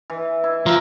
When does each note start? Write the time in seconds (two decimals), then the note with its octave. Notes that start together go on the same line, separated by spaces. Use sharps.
0.10 E3
0.44 E4
0.66 F3 F4 A#4